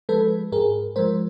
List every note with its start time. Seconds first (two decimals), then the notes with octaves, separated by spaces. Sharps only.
0.09 F3 G#3 A4 B4
0.52 G#2 G#4 A#4
0.96 F3 G#3 A#4 C5